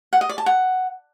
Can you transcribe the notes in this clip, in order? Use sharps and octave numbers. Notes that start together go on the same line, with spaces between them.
F#5
D#5
D5
A5
F#5